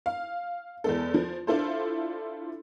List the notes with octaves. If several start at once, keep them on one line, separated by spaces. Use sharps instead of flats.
F5
E2 G#3 A4
F3
D4 E4 F4 A4 C5